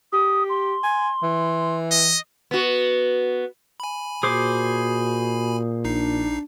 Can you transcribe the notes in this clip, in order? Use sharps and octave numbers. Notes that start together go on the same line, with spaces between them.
G4 D#6
C6
G#5
E3
D#5
B3 F#4
G#5 B5
A#2 F#4 G#4 C5 D6
A#1 D4 D#4 C7